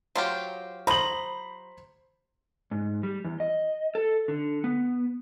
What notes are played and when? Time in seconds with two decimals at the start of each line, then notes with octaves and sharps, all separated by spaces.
0.16 F#3 F4 G4 C5
0.87 C5 A#5 B5 D#6 F#7
2.71 G#2
3.03 G3
3.24 E2
3.40 D#5
3.95 A4
4.28 D3
4.64 B3